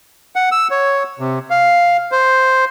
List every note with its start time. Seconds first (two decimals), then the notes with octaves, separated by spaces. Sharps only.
0.36 F#5
0.52 E6
0.71 C#5
1.19 C3
1.50 F5
2.12 C5